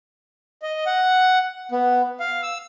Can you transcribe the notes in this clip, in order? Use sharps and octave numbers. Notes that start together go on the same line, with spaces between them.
D#5
F#5
B3
F5
E6